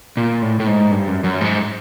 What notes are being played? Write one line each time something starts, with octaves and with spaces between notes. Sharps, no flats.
A#2
A2
A2
G#2
G2
F#2
F#2
G#2